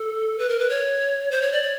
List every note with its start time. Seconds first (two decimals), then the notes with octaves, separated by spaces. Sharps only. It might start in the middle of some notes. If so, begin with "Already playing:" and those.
Already playing: A4
0.38 B4
0.49 A#4
0.59 B4
0.69 C#5
1.31 C5
1.41 C#5
1.52 D5
1.62 C#5